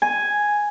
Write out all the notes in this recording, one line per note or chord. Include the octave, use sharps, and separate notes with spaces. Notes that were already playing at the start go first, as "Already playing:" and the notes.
G#5